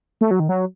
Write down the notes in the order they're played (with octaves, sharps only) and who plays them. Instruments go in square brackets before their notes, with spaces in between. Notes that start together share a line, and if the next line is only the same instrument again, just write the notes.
[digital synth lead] A3
F#3
D#3
F#3